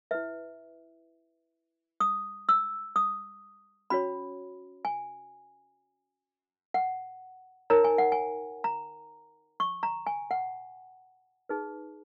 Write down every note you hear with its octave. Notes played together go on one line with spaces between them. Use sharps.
E4 B4 E5
D#6
E6
D#6
C#4 F#4 C#5 B5
G#5
F#5
D#4 A#4 C#5 A#5
G#5
F#5
G#5
A#5
C#6
A#5
G#5
F#5
D#4 G#4 B4